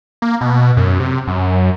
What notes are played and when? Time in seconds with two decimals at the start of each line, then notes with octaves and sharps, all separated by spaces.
0.22 A#3
0.41 B2
0.77 F#2
1.00 C3
1.28 F#2